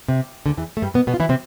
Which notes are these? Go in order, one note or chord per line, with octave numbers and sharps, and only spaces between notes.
C3
D2 D3
E2 E3
A3
G2 G3
B2 B3
B2 B3
F4
E3 E4
C3 C4